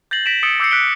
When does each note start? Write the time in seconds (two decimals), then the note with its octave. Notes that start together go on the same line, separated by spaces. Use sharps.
0.11 G6 A6 A#6 C7 F#7
0.26 A#6 B6 D7 E7
0.43 D#6 E6 A6 C#7 D7 G7
0.60 D6 E6 G6 A#6 C7 C#7
0.71 F#6 B6 D7 G7